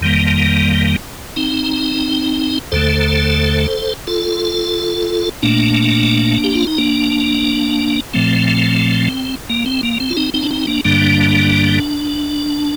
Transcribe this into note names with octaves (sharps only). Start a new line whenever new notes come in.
F2 D#3 G3 A#3
C4 D#4
D#2 D3 A3 A4 C5
F4 A4
A#2 A3 A#3 D4
G4
F4
D#4
A#3 D4
A#2 F3 A3 C4
A#3
C4
A#3
C4
F4
C4 D#4
C4 D#4
D4
C4 D#4
A#3 D4
G2 D3 G3 A#3 D4